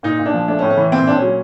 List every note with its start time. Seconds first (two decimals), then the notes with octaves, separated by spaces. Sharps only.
0.03 A#2 D#4
0.19 A#2
0.26 D4
0.34 F3
0.48 A3 D4
0.59 C#4
0.62 A2
0.70 C#4
0.77 E3
0.92 A#2 C4
1.07 A#2 D4
1.15 C#4
1.22 F#3